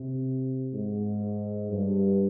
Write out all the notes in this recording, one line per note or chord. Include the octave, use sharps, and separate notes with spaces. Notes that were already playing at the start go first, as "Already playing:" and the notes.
Already playing: C3
G#2
G2